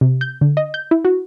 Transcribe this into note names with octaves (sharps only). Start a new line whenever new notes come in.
C3
G6
D3
D#5
G6
E4
F#4